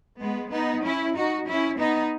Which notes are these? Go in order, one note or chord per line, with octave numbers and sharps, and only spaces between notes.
G#3 B3
B3 D#4
C#4 E4
D#4 F#4
C#4 E4
B3 D#4